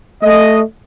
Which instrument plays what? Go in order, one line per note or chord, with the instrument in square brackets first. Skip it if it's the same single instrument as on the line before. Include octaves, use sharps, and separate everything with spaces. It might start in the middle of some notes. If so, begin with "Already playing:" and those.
[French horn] A3 [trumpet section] D#5